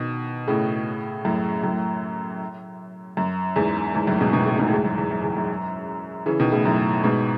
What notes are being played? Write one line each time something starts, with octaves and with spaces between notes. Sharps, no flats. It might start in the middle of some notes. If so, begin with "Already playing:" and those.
Already playing: B2 D#3
A2 C#3
F#2 A2
F#2 A2
F#2
E2 G#2
E2 G#2
F#2 A2
G#2 B2
B2 D#3
A2 C#3
G#2 B2
A2
E2 G#2
F#2
E2
F#2
E2
F#2
C#3 E3
B2 D#3
A2 C#3
F#2 A2
G#2 B2